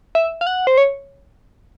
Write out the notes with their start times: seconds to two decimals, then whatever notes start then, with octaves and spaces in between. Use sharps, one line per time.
0.15 E5
0.41 F5
0.47 F#5
0.67 C5
0.78 C#5